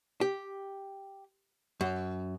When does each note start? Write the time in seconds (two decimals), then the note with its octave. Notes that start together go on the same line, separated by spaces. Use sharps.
0.21 G4
1.81 F#2